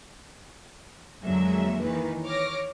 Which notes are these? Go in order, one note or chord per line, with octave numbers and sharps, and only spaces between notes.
F2 D3 F#3 G#3 A#3 E5
D#3 E3 B4
C#5 D6 F6 A#6